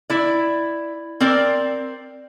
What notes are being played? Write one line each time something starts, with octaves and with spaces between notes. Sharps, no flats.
E4 D5
C4 A#4 D5